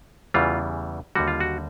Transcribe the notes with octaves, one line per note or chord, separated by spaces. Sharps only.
E2 C#3 E3 G3 F4
D#2 D3 G3 F#4
F4
F#4